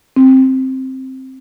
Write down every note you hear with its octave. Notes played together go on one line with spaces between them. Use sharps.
C4